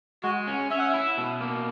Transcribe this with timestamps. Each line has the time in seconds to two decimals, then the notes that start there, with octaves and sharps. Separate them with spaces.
0.23 G#3 F#4
0.47 C#4
0.70 C#4 E5
0.78 F#5
0.87 E5
0.94 E4
1.18 B2
1.41 A#3